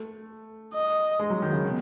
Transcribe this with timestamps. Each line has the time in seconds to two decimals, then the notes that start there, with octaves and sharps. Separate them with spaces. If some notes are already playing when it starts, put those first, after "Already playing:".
Already playing: A3
0.74 D#5
1.19 G#3
1.30 F#3
1.42 D#3
1.53 C#3
1.65 B2